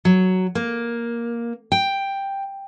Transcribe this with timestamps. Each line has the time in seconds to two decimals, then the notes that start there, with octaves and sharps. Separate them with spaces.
0.05 F#3
0.55 A#3
1.72 G5